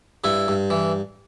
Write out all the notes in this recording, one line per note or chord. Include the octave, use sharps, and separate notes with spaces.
G2 E4
G2
E3